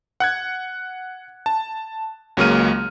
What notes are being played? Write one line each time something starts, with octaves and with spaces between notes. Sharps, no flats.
F#5 F#6 G#6
A5
C#2 F#3 G#3 A#3 F6 D#7